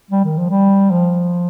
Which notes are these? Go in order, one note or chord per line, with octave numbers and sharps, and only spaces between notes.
G3
D#3
F3
G3
F3